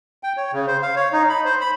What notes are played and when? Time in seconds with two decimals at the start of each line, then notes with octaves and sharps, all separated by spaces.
0.23 G5
0.37 C#5
0.53 C#3
0.68 C5
0.82 F5
0.96 C#5
1.13 D#4
1.29 B5
1.45 C5
1.61 B5